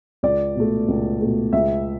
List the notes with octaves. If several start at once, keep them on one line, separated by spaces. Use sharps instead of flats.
C#2 D5
B2 A3
C#2
B2 A3
C#2 E5